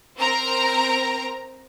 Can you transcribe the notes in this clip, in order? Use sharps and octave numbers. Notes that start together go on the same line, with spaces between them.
C4 A#4 A#5